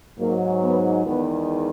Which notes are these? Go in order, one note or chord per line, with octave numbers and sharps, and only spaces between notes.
G#2 F#3 A#3
B3
E2 D#3 G#3 B3